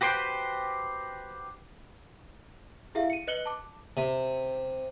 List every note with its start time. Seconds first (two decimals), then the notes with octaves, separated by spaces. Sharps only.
0.01 F#4 G4 B4 C5 G5
2.95 E4 G4 G#4 E5 F5
3.10 C#7 D#7
3.27 B4 D#5 F#6 C#7 F#7 G7
3.46 A5 D6
3.97 C3